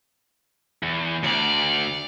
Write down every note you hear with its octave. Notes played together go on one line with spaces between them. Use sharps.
E2
D2 D5 F6